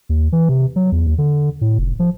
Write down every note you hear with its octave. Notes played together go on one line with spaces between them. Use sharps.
D#2
E3
C3
F#3
E2
D#2
D3
A2
F1
F3